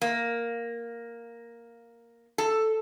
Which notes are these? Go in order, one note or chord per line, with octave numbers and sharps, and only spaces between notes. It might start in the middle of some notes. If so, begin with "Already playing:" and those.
A#3
A4